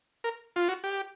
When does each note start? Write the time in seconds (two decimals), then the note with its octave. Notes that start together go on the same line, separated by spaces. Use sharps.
0.24 A#4
0.56 F4
0.69 F#4
0.84 G4